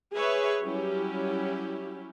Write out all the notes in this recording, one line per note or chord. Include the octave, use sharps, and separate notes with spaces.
G#4 B4 C#5 E5
F#3 G3 C#4 E4 G4